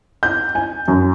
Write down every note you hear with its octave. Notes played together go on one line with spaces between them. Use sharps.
G6
G#5
F#2